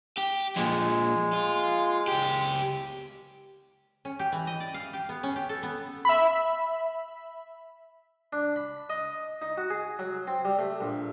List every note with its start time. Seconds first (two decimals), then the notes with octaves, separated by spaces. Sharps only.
0.18 G4
0.56 F2 A#2 G#3
1.34 F4
2.08 C#2 G4
4.05 C#4
4.19 G4
4.32 E3
4.47 D#5
4.60 D5
4.74 F5
4.93 G4
5.09 B3
5.23 C#4
5.36 G4
5.49 A4
5.63 B3
6.05 E5 B5
8.33 D4
8.56 B5
8.90 D#5
9.42 D#4
9.57 F#4
9.70 G#4
9.99 F#3
10.27 C4
10.45 G3
10.59 A3
10.80 A#1